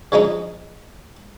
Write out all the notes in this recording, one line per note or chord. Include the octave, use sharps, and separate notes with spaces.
C#3 F3 G#3 D#4